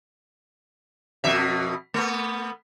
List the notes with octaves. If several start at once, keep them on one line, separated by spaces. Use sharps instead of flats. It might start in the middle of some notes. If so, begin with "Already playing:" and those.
F2 B2 E5
A3 B3